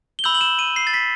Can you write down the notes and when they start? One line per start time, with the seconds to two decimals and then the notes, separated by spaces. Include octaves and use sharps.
0.19 G7
0.24 B5 E6 G6 F#7
0.34 F#7
0.41 E7
0.59 D#7
0.76 C7
0.87 A6
0.94 B6